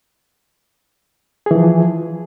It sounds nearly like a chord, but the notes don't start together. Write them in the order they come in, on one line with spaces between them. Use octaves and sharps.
G#4 E3 F3